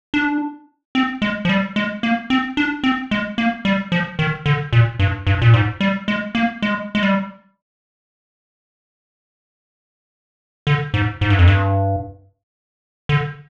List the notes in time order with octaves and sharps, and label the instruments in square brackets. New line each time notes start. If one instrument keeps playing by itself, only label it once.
[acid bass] D4
C4
G#3
F3
G3
G#3
A#3
C4
D4
C4
G#3
A#3
G3
F3
D#3
D3
A#2
G2
G2
A#2
G#2
G3
G#3
A#3
G#3
G#3
G3
D3
G#2
G#2
G2
F2
G2
D3